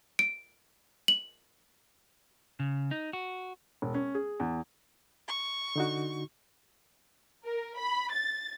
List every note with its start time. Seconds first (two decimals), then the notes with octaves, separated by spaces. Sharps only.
0.19 D7
1.08 F#7
2.60 C#3
2.91 D#4
3.13 F#4
3.82 E1
3.94 C#4
4.15 G#4
4.40 E2
5.28 C#6
5.76 D3 D#4 F#4
7.44 A#4
7.77 B5
8.11 A6